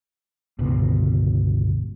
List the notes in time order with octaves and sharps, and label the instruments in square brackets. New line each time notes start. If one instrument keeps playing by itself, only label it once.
[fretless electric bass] G1 C#2 B2